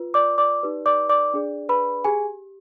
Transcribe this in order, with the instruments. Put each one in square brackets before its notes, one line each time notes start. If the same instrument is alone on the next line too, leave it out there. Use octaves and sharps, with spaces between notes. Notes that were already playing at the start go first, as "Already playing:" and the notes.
Already playing: [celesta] F4 B4
D5 D6
D5 D6
D#4 G4 B4 D5
D5 D6
D5 D6
D4 G#4 D5
B4 B5
G4 G#4 G#5